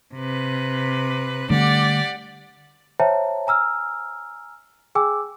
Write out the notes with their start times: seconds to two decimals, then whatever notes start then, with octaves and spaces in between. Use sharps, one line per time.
0.14 C3 B4
1.50 D3 G3 A3 G4 D5 F#5
3.00 C5 C#5 E5 G5 A5 A#5
3.47 G#5 A#5 E6 F6
4.95 G#4 G5 G#5 D6 E6